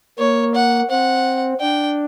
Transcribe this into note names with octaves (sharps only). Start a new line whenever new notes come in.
A#3 C#5
F#5
C4 F#5
D4 G5